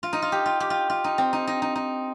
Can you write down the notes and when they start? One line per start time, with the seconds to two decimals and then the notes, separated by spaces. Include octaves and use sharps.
0.03 F4
0.13 D#4
0.22 F4
0.32 G4
0.46 F4
0.60 G4
0.70 F4
0.90 F4
1.04 D#4
1.18 C4
1.33 D#4
1.47 D#4
1.62 D#4
1.76 D#4